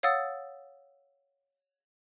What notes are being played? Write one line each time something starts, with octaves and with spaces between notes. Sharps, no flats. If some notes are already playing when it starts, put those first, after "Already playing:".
C#5 F5 F#5 D#6 E6 A6